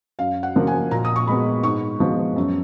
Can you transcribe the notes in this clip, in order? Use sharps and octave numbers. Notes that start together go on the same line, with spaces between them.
F#2 F5
F#5
C#3 F3 A#3
G#5
A#2 A#5
D#6
C#6
G#3 B3 B5
G#2 C#6
F3 G#3 B3
F#2